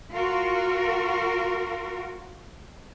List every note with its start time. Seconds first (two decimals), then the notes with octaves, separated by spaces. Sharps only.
0.12 F4 F#4 A#4